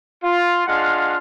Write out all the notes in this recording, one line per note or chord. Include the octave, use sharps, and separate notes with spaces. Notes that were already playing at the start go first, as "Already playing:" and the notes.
F4
G#3 D4 F4 F5 F#5